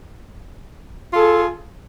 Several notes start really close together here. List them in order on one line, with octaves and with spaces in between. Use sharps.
F4 A4 G#4